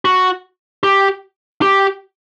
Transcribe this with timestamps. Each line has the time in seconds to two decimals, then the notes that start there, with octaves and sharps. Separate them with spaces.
0.05 F#4
0.83 G4
1.62 G4